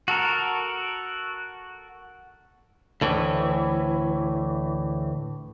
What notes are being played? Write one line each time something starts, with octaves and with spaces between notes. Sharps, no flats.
F#4 A4 A#4
D2 A2 E3